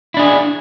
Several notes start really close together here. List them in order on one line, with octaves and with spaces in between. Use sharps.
E4 D4 G#4